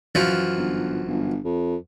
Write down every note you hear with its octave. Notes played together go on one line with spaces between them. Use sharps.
F#2 E3 F3
G1
G1
F2